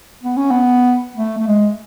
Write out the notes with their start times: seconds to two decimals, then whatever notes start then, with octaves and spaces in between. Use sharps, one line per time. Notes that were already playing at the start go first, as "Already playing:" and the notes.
0.23 B3
0.37 C#4
0.51 B3
1.16 A3
1.38 A3
1.47 G#3